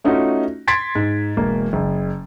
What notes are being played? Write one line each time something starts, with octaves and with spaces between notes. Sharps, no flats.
A3 C#4 D#4 F4 F#4
C6 G#6 A6 B6 D7
G#2
E1 A#3
F#1